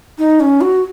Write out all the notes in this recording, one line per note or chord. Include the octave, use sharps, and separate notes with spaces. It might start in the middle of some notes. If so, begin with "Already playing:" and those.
D#4
C#4
F#4